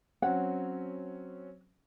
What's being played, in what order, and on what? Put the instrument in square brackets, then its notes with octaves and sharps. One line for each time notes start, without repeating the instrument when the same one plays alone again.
[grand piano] F#3 C4 C#4 [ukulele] F#5